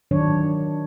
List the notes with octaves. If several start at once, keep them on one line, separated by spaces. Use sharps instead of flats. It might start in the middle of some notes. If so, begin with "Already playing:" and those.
D#3 F#3 D4 C#5